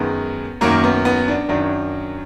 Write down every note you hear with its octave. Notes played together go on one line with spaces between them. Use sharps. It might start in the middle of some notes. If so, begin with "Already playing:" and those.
Already playing: F#2 D#3 G#3 B3
F#2 D#3 F#3 A#3
B3
B3
D4
F#2 D#3 F#3 D4